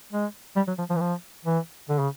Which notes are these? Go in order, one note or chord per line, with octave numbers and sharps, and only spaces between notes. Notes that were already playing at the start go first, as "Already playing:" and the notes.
G#3
G3
F#3
F3
F3
E3
F3
E3
D3
C#3